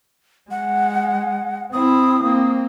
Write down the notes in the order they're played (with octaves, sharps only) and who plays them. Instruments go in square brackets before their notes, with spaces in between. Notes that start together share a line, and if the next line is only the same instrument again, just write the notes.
[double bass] G#3 [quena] F#5
[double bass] C4 E4 [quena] D#6
[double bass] A#3 C4